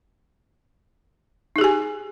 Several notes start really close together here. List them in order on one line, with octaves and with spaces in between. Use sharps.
D#4 G#4 G4 G#5